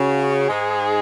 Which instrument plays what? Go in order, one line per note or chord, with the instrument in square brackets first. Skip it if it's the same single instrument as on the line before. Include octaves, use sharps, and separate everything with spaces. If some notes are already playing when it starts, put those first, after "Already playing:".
Already playing: [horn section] C#3 [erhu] F#4
[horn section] G#2 G#3 [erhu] G#4